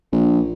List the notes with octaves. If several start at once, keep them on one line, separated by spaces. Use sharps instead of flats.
A#1